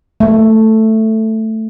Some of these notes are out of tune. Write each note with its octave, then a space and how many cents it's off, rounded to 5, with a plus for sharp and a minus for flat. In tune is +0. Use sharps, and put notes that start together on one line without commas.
A3 +5